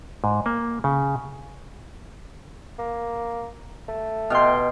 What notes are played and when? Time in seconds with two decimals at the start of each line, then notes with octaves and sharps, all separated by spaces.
0.24 G#2
0.46 A#3
0.84 C#3
2.78 A#3
3.88 A3
4.30 B2 G5 C6 F6